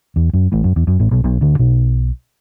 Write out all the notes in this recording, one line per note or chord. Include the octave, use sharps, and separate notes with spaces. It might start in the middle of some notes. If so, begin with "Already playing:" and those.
E2
F#2
A1 A2
F#2
E2
F#2
A1 A2
B1 B2
B1 B2
D2 D3
B1 B2